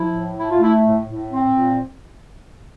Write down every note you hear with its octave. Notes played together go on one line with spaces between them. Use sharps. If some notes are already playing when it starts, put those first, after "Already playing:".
Already playing: F3 E4
A2
A3 E4
F4
A3 E4
A2
A2
C4
A#2